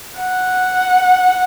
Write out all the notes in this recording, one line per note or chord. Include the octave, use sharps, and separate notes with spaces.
F#5